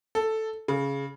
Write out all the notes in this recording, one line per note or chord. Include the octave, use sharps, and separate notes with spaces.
A4
C#3